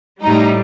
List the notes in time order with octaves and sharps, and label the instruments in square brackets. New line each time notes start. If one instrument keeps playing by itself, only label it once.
[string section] A2 G3 D#4